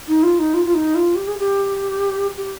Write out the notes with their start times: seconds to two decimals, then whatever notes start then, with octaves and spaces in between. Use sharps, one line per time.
0.08 D#4
0.23 F4
0.39 D#4
0.54 F4
0.66 F4
0.74 D#4
0.95 F4
1.15 G4
1.28 G#4
1.39 G4
2.37 G4